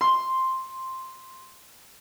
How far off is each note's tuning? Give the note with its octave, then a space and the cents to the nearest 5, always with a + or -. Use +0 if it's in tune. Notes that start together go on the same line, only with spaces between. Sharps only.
C6 +0